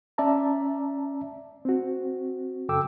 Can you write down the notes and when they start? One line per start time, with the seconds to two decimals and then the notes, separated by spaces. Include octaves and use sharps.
0.18 C#4 D5 E5 A5 A#5
1.65 C4 F#4
2.69 F#2 C#3 A4 G5 D6 E6